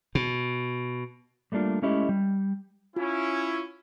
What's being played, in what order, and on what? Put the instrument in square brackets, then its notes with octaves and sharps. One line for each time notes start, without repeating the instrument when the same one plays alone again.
[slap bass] B2
[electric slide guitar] G3 A3 A#3 D4 F4
G#3 A3 C#4 E4 G4 D#5
G3
[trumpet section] C#4 E4 [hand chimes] F4